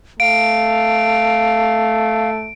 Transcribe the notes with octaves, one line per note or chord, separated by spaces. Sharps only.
A3 F5 D7